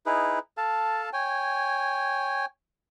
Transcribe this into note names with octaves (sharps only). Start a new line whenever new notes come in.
D#4 E4 G#4 B4
A4 F5 A5
C#5 G5 G#5